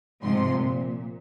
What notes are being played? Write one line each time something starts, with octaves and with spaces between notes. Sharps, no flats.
G#2 C3 F3 C6
A#2